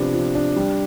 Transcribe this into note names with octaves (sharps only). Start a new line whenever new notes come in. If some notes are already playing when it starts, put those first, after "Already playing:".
Already playing: C3 F3 B3 D4
F3
D4
G3